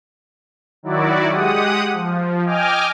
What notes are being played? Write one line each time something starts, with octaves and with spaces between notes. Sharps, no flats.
D#3 F#3 E4 F#4 D5
G#3 G4 F#5 D#6
F3
D#5 G5 G#5 D6 F6